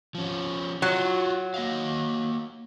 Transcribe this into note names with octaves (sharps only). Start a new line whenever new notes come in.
F3 C#4
F#3 F4 F#4
A#3 D#5 F5